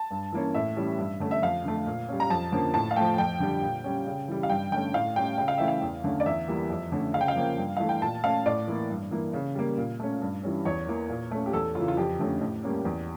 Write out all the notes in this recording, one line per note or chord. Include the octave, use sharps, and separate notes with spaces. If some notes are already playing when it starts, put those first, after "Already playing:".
Already playing: A5
G2
E3 A#3 C#4
A2 E5
E3 G3 C#4
G2
D3 A3 C#4
E5
F2 F5
D3 A3
A#2
G3 C#4
A#5
F2 A5
D3 F3 A#3 C#4
A2 A5
F5
F3 A3 G5
F2 G5
D3 G3
A#2
G3 C#4
C#3
E3 G3
F5
G2 G5
D3 A3 C#4 G5
A2 F5
G3 C#4 G5
C#3 G5
F5
E3 A3 C#4 E5
F5
E2
D3 A3 C#4
D5
E2 E5
E3 G3 A#3
F2
D3 A3 C#4
C#3 F5
G5
F5
F3 A#3 C#4
G2
E3 A3 F5
G5
A#2 A5
A3 C#4 F5
A2 D5
E3 A#3
G2
E3 A#3
C#3
G3 A#3
A#2
A3 C#4
G2
E3 G3 C#4
E2 C#5
E3 A#3
A#2
A3 C#4
G4
E2 A4
C#3 E3 F4
F4
F2 G4
D3 A3 C#4
A2
G3 A#3 C#4
E2